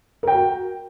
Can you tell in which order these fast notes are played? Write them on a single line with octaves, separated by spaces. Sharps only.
A#4 G5 F#4